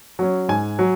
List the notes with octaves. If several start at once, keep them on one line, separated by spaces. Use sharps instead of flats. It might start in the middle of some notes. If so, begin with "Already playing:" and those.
F#3 C#4
G#2 G#5
F#3